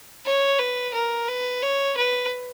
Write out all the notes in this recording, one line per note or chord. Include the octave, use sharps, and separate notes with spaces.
C#5
B4
A#4
B4
C#5
B4